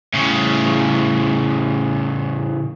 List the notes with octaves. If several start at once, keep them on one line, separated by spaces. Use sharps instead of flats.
A2 C#3